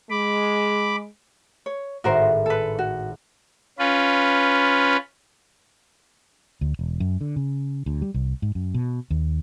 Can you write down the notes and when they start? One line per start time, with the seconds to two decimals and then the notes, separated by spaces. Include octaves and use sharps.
0.10 G#3 B5 D6
1.66 C#5
2.04 G#1 A2 F#4 A#4 C5
2.46 A4 B4
2.79 F#4
3.79 C#4 F4 B4
6.61 D2
6.79 E1
7.00 F#2
7.21 D3
7.36 C#3
7.86 D2
8.02 G3
8.14 C2
8.42 G#2
8.55 F#2
8.74 B2
9.11 D#2